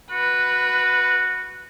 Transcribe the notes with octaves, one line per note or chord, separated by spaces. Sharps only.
F#4 B4